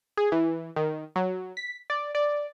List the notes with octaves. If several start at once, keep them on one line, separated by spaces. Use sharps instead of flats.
G#4
E3
D#3
F#3
B6
D5
D5